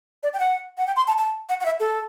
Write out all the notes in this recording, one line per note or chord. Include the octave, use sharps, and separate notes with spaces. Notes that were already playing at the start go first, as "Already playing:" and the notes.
D5
G5
F#5
F#5
G5
C6
A5
A5
F#5
F#5
E5
A4